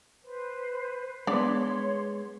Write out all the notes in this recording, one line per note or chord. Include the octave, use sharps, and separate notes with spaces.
B4 C5
G#3 B3 D4 C#5 D5 C6